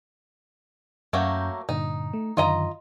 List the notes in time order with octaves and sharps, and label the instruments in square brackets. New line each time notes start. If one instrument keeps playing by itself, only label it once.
[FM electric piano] F#2 C#4 G6 [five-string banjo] F#3 A3 A#3
[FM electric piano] G2 A#2 D3 [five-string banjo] D#4
[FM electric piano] A3
[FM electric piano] F#2 D3 D#3 [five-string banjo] F4 D#5 A#5